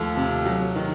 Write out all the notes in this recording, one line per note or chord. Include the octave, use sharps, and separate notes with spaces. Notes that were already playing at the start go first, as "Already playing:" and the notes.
Already playing: D#2 F3 A3
C3
F#3
D#3